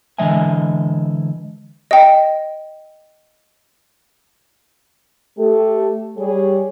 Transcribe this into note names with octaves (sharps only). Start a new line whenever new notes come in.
D3 E3 G#3 D#5 E5 G#5
D#5 G5
A3 G4 A4
G3 G#4 C#5